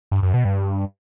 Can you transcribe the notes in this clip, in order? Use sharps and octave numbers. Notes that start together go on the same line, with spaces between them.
G2
F#2
B2
G2